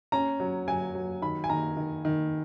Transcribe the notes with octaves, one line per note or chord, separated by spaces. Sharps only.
C#4 A#5
F#3
F#3 G#5
F#3
D#3 B5
G#5
D#3 A#5
D#3
D#3